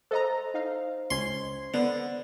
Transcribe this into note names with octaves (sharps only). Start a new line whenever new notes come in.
A4 C5 D#5 A#5
D#4 F5
C#2 C#4 C6 G#6
D3 B3